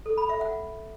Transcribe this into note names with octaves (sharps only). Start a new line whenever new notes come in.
A4
B5
E5
F#5